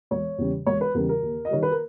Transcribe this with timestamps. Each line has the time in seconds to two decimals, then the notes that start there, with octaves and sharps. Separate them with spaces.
0.11 E1 C#5
0.38 E2 C#3 G3
0.66 E1 C#5
0.81 B4
0.94 E2 C#3 G3 A#4
1.09 A#4
1.22 D#2
1.45 D#5
1.51 D#3 G3 C#5
1.63 B4
1.71 A#4